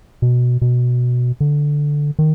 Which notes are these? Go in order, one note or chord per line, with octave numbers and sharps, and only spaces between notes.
B2
B2
D3
D#3